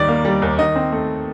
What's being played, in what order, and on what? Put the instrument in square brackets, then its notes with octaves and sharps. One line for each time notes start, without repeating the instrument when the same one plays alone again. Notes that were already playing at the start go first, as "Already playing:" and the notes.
Already playing: [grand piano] D#2 D#3 G3 D5
A#3
G3
D#2
D#3 D#5
C4
A3